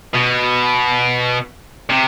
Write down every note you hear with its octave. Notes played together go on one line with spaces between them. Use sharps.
B2
C3